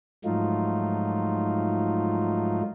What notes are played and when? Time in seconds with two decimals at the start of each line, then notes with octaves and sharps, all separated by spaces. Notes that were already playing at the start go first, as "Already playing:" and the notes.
0.25 G#2 F3 F#3 A3 D#4 F4